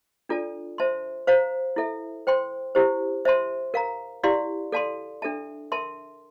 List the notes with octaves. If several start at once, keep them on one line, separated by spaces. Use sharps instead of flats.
D4 F4 A4 D5 A5
C5 E5 A5 C6
C5 F5 A#5
E4 A4 E5
C5 G5 C6
E4 G4 C5
C5 E5 A5 C6
A#4 F5 A#5
E4 G4 D5 F5 C6
A4 D5 F5 A5 C6
D4 A4 E5 A5
A#4 E5 A5 C6